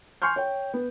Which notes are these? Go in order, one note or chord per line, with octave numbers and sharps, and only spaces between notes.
G#5 C6 C#6 F6 G6
C#5 G5
B3